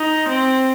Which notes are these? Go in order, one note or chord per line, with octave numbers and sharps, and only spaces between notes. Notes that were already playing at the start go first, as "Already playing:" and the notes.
Already playing: D#4
C4